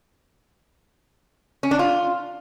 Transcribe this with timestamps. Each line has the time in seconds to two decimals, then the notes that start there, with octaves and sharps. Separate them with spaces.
1.63 C#4
1.71 D4
1.79 F4